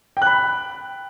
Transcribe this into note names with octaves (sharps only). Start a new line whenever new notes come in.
G5 B5 F#6